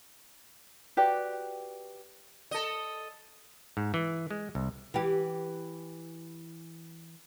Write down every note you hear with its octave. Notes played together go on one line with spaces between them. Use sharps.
F#4 G4 B4 D5
A4 D#5
G#2
E3
G#3
C2
E3 G4